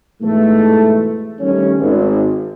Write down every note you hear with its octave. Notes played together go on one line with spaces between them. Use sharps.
G#2 B2 E3 A3
D#3 G3 A3 C#4
G#1